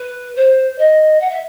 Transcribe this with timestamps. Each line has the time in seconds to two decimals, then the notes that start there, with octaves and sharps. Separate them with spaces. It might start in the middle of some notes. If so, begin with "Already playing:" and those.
Already playing: B4
0.35 C5
0.78 D#5
1.20 F#5
1.30 E5